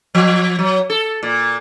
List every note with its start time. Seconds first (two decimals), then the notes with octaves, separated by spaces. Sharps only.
0.15 F3
0.59 F#3
0.90 A4
1.23 A#2